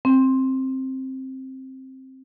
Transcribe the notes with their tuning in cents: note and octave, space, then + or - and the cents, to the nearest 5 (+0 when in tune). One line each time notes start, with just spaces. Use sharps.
C4 +10